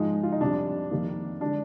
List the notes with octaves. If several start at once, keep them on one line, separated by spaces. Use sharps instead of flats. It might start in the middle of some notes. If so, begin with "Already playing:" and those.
Already playing: G#2 F3 G#3 D#4
F4
D#4
F2 C3 G3 D4
F2 C3 D#3 G3 A#3
D3 G#3 D4